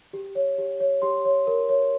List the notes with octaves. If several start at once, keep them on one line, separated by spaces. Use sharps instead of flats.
G4
C#5
G4
C#5
G4 C6
C#5
A#4
C#5